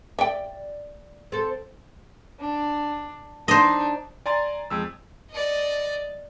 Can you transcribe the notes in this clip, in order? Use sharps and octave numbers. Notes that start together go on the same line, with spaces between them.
D5 E5 G5
C4 A4
D4
D4 D#4 C5 D#5
D5 G#5 A#5 C6 A6
F2 G#3 E6
D5 D#5